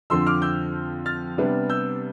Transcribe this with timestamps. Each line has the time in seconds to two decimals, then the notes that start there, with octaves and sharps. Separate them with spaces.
0.10 F2 D3 F3 C4 C6 E6
0.26 D6 F6
0.42 E6 G6
1.06 F6 A6
1.38 C3 G3 B3 D4
1.69 E6 G6